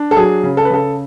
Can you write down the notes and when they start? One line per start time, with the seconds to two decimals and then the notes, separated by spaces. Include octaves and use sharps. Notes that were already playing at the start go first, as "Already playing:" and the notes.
Already playing: D4
0.11 A4
0.16 F#3 G#4
0.43 C#3
0.57 A4
0.65 B4
0.70 C#3 A4